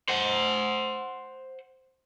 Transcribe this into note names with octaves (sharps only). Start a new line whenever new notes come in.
C5 F#5